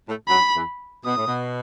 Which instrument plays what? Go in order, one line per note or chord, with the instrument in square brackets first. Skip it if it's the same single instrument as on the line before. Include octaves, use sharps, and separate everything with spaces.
[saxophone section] A2 A3
[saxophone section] F#2 F#3 [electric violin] B5
[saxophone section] E2 E3
[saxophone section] B2 [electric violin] D#6
[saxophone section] A2
B2